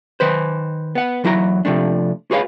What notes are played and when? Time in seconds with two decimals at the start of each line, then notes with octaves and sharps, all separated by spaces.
0.20 D#3 B4 C5
0.95 B3 F#5
1.24 E2 F#3 E4 F#4 A#5
1.65 C3 F3 A3 D4
2.31 F#4 G#4 B4 C#5 E5 F5